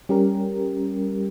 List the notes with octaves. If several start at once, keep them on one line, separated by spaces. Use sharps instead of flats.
G3 C#4 G4 A#4